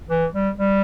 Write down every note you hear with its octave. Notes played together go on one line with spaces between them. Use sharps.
E3
G3
G3